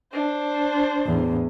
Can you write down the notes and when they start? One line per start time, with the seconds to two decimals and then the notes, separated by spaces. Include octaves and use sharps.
0.13 D4 C5
1.05 E2 A2